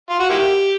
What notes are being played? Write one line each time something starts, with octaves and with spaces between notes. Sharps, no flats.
F4
F#4
A#3 E4 G4